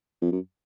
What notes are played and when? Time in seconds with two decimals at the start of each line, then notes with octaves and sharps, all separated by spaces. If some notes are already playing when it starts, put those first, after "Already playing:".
0.22 F2
0.32 F#2